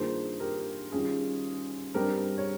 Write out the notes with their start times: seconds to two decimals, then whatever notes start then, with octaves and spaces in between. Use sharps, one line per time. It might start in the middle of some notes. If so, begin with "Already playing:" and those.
Already playing: G2 D#3 A#3 F4 G#4 C5
0.40 G4 A#4
0.92 D#3 G3 C#4 F4 G#4
1.94 G2 G3 C4 G4 A#4
2.38 C#5